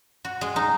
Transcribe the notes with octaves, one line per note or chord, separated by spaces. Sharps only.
F#4
G#3
D#4